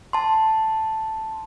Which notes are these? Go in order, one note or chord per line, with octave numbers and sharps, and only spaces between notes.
A5 C6